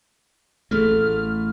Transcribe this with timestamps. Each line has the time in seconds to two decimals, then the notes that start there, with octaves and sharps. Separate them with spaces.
0.71 A1 A3 G#4 A4 F6